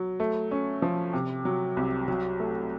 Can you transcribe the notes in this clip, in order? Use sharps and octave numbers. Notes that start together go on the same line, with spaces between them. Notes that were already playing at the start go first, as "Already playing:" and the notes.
Already playing: F#3
A3
C#4
F3
C3
F#3
C2
F#3
A3